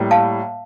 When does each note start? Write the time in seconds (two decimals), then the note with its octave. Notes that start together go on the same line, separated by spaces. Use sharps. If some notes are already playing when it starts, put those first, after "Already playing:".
Already playing: A2 G3 A#3
0.11 F5 A5